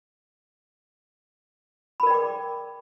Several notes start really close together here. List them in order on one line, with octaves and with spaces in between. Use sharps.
B5 A#4 D5 G5 D6